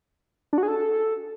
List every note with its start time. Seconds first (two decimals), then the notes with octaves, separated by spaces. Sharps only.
0.53 D4
0.58 F#4
0.63 G#4
0.68 A4